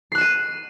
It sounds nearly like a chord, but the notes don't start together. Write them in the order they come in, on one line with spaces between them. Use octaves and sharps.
C7 F#6 E7 D#7